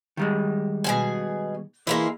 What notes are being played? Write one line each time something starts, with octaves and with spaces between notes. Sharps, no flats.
D#3 G3 G#3
B2 G#4 G#5
E3 G#3 A#3 E4